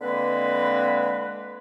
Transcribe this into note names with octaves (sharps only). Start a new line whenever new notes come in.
D3 G#3 A#3 C4 B4